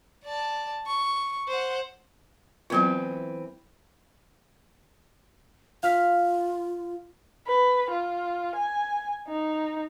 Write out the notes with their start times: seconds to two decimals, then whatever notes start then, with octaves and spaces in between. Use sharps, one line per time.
0.25 D5 A5
0.87 C#6
1.48 C5 F#5
2.70 E3 F#3 B3 C4 F4 B4
5.83 F4 F5 F6 B6
7.47 B4
7.91 F4
8.55 G#5
9.28 D#4